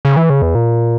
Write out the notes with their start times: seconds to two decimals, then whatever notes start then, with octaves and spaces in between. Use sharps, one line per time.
0.05 C#3
0.17 E3
0.30 C#3
0.42 E2
0.55 A#2